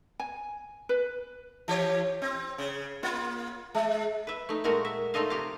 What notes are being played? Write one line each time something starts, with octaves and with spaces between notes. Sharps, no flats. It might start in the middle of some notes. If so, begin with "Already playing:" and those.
G#5
B4
E3 G4 C#5
C4
C#3
A#3 F4
G#3
B4 E5
A3 D#4
A#2 G#3 A3 F#4 A#4 F#5
E5
A3 D#4 F4 A4 D#5 F5
C3 G4 F5